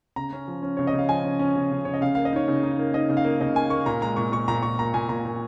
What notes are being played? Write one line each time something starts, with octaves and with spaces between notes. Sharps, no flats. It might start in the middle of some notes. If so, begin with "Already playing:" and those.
C#3 A#5
C#4
F3
C#4
C#3 C#5
D#5
C#3
F5
F3 G#5
C#4
C#4
C#3
C#3
C#3 C#5
D#5
C#3 F5
A#3 F5
D#5
D#4 C#5
C#3
D#4
A#3
D#4 D#5
C#3
F5
A#3
C#3 D#5
A#3 G#5
A#3 C#6
A#2 A#5
G#3 A#5
A#2 C#6
A#2 C#6
A#2 A#5
A#2 C#6
A#2 A#5
A#2 G#5
A#2 A#5
A#2